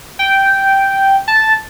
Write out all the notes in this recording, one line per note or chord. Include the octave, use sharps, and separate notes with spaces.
G5
A5